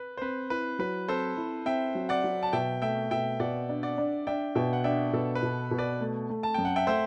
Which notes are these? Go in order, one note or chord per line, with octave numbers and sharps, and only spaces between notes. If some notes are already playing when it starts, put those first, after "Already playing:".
Already playing: B4
C5
C4 B4
E4 B4
F#3 B4
C4 A4 C5
E4
C4 E5 G5
F#3
D5 F#5
F#3
A5
B2 E5 G5
A3 E5 G5
B2 E5 G5
B2 D5 F#5
D4
D5 F#5
D4
D4 E5 G5
B2 E5 G5
F#5
D4 E5 G5
B2 A4
B4
B2
B2
B4 D5
A3
A3
A5
F#2 G5
F#5
E5 G5
A3 C5 E5